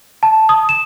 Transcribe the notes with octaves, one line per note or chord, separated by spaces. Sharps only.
A5
D#6
E7